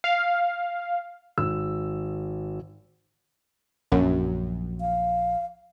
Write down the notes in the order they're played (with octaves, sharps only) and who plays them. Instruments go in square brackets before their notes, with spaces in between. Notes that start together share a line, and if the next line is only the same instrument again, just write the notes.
[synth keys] F5
[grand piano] G#1 E6
[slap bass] A#1 [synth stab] F#2
[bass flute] F5